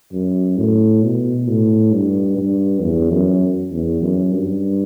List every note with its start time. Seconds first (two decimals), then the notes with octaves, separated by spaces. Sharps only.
0.13 F#2
0.58 A2
1.03 B2
1.48 A2
1.92 G2
2.37 G2
2.82 E2
3.13 F#2
3.72 E2
4.02 F#2
4.32 G2